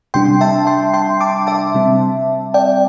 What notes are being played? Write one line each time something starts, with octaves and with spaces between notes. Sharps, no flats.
C3 G3 D4 G5 C6
E5 A5
G5 C6
G5 C6
A5 D6
E5 A5
C3 G3 C4
D5 G5